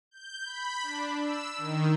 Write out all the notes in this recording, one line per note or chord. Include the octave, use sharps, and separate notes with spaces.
G6
B5
D4
E6
D#3